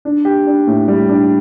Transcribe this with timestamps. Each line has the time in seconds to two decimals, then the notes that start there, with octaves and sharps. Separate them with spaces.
0.05 D4
0.25 G4
0.47 D4
0.67 A2
0.88 G3
1.09 D4